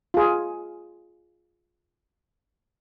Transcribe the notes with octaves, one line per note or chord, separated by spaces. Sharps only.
F4 G#4